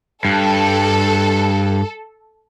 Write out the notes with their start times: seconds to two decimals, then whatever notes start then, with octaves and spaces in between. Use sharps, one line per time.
0.25 G2 A4